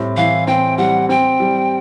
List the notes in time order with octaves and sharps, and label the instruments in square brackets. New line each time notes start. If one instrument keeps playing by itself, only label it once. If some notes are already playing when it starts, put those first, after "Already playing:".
Already playing: [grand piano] A2 G3 C4
[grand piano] E3 [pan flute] F5
[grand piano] C4 [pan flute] G5
[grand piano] G3 [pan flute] F#5
[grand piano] C4 [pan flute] G5
[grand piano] G3